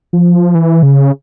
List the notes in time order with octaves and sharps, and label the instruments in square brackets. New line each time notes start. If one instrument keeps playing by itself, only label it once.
[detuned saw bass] F3
E3
C#3